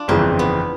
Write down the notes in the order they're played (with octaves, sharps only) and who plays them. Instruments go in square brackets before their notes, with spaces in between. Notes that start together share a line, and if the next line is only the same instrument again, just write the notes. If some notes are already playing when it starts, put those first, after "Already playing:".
Already playing: [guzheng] D4 F4
[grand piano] G1 F2 C#3 E3 [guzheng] C4
[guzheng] B3